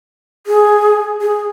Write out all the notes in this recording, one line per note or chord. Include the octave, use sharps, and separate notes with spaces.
G#4
G#4